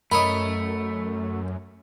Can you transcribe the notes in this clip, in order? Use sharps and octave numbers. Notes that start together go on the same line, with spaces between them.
F#2 A3 A#4 C#5 D#5 B5